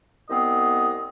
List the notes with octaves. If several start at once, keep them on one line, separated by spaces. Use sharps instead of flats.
C2 B3 C4 D#5